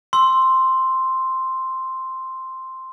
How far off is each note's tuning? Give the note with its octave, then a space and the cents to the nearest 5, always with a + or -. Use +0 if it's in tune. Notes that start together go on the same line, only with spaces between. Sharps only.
C6 +0 E6 +0